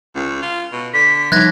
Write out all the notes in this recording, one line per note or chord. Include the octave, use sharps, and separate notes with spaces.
C#2
F4
B2
D3 B6
F3 G3 D#4 F#6 G#6 A#6